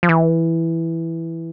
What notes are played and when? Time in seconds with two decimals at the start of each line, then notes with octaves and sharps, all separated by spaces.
0.03 F3
0.09 E3